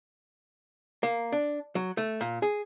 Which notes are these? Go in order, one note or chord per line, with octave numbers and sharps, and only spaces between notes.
A#3
D4
F#3
A3
A#2
G#4